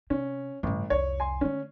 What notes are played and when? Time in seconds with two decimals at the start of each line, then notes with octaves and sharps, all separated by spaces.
0.10 C3 C#4
0.63 A1 G2 C#3
0.90 C2 F2 C#5
1.20 G#5 C6
1.41 D3 A3 C#4